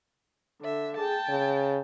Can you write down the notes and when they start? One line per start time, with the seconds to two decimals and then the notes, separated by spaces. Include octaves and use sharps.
0.63 D3 E5
0.97 G#4 G5 A5
1.29 C#3